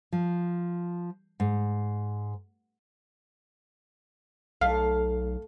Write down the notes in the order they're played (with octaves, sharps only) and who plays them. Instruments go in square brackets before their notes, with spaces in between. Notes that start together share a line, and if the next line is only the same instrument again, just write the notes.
[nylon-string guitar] F3
G#2
[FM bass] B1 [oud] A3 [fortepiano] F5